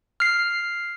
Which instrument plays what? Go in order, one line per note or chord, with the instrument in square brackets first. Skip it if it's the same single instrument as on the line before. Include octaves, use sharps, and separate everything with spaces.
[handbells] F6 C7